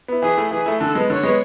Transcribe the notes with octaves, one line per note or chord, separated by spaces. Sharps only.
B3 E4
E3 G#4
A3 E4
E3 G#4
A3 E4
D3 A4
G#3 B3
D3 C#5
G#3 B3